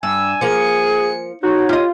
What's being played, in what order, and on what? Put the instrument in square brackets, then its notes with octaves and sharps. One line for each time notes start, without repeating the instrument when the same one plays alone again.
[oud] G2 [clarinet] G#5 [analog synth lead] E6
[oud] F3 A#3 [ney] G#4 [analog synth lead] C#7
[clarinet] D#4 [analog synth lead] F#4 [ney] C#5
[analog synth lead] F4 [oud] G4 D#5